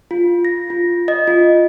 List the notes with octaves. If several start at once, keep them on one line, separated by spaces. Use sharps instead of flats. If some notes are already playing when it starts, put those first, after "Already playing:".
F4
A#6
F4
D#5
F4